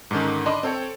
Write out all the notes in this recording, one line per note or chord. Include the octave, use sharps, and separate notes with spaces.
G#2 D3 D#3 C#4
D4 D5 D#5 B5 C6 D6
C4 A4 C#5 G5